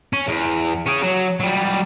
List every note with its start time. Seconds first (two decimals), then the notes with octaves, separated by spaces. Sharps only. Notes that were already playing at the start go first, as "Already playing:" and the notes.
0.13 C#4
0.28 E2
0.86 C#4 G#4
1.02 F#3
1.40 F#3 G3